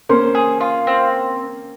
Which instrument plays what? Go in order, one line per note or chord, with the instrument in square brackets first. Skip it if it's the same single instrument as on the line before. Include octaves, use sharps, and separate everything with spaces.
[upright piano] A#3 C#4 [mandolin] C5
[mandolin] G#4
F4
C4